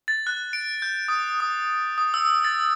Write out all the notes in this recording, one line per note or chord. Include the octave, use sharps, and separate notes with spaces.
A6
F#6
D7
G6
D#6
D#6
D#6
E6
A6